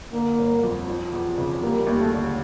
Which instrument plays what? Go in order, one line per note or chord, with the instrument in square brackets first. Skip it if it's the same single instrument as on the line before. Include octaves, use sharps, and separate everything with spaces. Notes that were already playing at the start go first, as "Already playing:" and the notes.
[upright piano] D3 [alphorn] A#3
[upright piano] G1
F2
F3
E2
C#3
[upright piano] G3 [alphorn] A#3
[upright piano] D#2
[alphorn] A3
[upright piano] D3